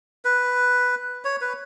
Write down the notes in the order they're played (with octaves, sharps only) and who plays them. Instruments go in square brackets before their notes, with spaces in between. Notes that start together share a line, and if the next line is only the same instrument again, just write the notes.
[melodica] B4
C#5
B4